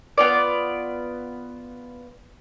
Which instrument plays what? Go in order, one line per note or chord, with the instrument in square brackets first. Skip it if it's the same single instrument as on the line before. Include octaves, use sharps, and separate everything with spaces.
[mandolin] B3 F4 D5